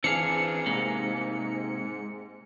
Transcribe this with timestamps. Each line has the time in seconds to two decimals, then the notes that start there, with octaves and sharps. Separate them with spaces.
0.04 E3 C4 D4 G#4 F5 C#7
0.66 G#2 C3 A#3